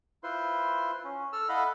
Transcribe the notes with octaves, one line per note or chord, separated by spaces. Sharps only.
E4 F4 B4 C5 C6
C#4
A4 E6 F6
E4 A4 D#5 F5 F#5 B5